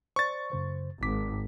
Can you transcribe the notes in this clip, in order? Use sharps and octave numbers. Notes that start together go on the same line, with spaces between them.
C5 D5 C#6 A6
F#2 C#3 C5
G#1 D6 B6